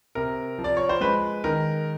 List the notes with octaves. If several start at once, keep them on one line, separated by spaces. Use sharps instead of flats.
C3 A#4
F3
D5
C#5
C5
G#3 B4
D#3 A#4